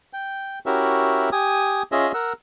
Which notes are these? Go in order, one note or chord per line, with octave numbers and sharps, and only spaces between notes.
G5
C#4 E4 F#4 G4 A#4 E5
G4 G#5 D#6
C#4 F4 G#4 D#5 E5
A#4 F#5 E6